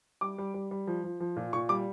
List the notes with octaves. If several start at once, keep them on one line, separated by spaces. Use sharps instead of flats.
G3 D6
G3
G3
G3
F3
F3
F3
A#2
A#2 C#6
G3 D6